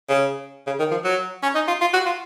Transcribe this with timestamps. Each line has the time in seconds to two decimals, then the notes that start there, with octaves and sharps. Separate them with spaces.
0.09 C#3
0.67 C#3
0.79 D#3
0.91 F3
1.04 F#3
1.43 C#4
1.55 D#4
1.68 F4
1.81 F4
1.93 F#4
2.06 F4